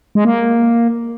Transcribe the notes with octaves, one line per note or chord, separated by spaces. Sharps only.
G#3
A#3